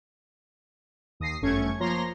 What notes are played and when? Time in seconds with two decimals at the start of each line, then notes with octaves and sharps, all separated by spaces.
1.20 D#2 D#6 A#6 C7
1.42 G1 F#2 A3 C#4 C#6 G#6
1.80 F3 A#3 C#5 A#5 C6 A#6